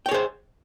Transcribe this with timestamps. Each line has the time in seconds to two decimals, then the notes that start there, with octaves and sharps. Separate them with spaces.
0.06 G5
0.09 C#5
0.11 G#4
0.14 C5